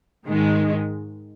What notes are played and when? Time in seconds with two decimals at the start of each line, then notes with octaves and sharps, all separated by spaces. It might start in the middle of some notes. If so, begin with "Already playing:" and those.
0.25 G#2 D#3 G#3